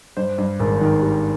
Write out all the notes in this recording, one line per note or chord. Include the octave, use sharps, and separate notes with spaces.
G2 C5
G2
G#1
D#3
G3